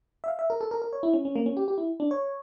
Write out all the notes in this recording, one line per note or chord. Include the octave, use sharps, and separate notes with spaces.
E5
F5
E5
A#4
A4
A#4
A#4
C#5
E4
C#4
C#4
A#3
C#4
G4
G4
E4
D4
C#5